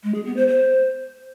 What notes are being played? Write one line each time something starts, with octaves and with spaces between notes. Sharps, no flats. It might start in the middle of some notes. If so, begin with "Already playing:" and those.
G#3
G#4
B3
C5
C5